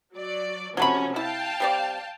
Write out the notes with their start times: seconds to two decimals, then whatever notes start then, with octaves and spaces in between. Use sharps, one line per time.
0.15 F#3 D5
0.77 C3 F3 F#3 A3 C#4 B5
1.16 E4 F5 G5 A5
1.60 G3 C4 D5